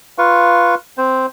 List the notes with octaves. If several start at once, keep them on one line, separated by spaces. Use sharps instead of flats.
F4 B4 F5 C#6
C4 C5